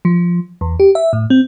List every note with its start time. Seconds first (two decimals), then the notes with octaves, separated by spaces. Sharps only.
0.05 F3
0.61 E2
0.80 G4
0.95 E5
1.13 A2
1.30 C4